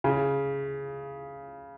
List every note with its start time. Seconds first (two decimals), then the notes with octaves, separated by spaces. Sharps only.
0.04 C#3